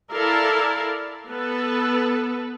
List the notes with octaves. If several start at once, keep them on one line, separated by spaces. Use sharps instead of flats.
E4 A4 A#4 D5 F5
B3 A4 B4